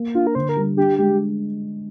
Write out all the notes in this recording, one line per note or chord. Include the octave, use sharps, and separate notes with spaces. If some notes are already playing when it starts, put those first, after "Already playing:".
Already playing: A#3
D4 F4
A#4
D3 C5
A#4
G3
D4 G4
G#3 G4